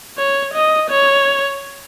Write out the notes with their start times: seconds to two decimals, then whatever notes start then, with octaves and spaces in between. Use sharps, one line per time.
0.18 C#5
0.54 D#5
0.91 C#5